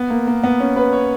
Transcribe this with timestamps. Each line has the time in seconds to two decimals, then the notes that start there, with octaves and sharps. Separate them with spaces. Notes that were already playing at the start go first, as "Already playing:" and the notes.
Already playing: B3
0.10 A#3
0.27 A#3
0.44 B3
0.60 C#4
0.76 B4
0.93 C#5